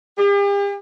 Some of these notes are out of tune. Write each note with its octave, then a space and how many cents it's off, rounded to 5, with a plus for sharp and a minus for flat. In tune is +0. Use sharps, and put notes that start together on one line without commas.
G4 +45